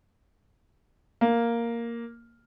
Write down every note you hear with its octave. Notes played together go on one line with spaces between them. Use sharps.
A#3